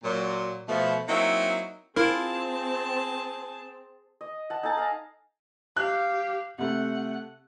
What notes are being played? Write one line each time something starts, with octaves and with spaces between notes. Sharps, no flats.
A#2 F#3
B2 F3 A3
F#3 A#3 C4 D#4 E4 C#5
C4 E4 F4 G#4 A#4 A5
D#5
F#5 A5
D#4 A4 G#5 A5
F5 A#5
G4 F5 F#6
C3 A3 F#5